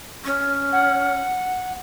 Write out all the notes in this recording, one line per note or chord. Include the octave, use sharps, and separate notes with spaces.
C#4
F#5